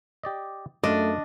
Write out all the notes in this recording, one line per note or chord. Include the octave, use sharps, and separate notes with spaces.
G4 D5 D#5
F#2 A3 D4 F4 D#5